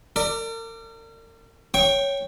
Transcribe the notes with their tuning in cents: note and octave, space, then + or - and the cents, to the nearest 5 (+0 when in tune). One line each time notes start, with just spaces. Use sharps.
A#4 -40 D5 +0
C#5 +0 G5 +0 C#6 -25